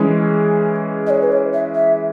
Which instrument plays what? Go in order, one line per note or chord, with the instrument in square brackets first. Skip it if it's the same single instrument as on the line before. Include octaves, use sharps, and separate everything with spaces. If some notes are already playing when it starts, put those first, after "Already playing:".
Already playing: [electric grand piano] E3 G#3 C#4 G#4
[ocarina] D#5
C#5
B4
C#5
E5
E5